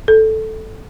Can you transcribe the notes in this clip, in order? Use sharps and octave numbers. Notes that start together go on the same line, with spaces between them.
A4